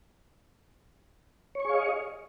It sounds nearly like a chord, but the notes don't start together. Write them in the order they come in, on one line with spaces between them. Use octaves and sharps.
C#5 C#6 G#4 F5 D#5